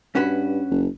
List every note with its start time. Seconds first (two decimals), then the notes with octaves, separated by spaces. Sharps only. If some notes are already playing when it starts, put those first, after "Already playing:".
0.15 G2 C#4 F#4 B4
0.71 F#1